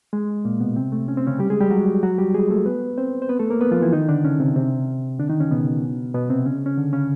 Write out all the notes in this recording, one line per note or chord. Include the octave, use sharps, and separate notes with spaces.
G#3
A#2 A#3
B2 B3
C3 C4
A3
C#4
C4
C#3 C#4
G3 G4
G#3 G#4
G3 G4
F#3 F#4
F#3 F#4
G3 G4
G#3 G#4
A3 A4
B3 B4
C4 C5
C5
B3 B4
A3 A4
A#3 A#4
B3 B4
F3 F4
E3 E4
D#3 D#4
D3 D4
C#3 C#4
C3 C4
C3 C4
D3 D4
D#3 D#4
C#3 C#4
B2 B3
B2 B3
C3 C4
C#3 C#4
C#4
D3 D4
C#3 C#4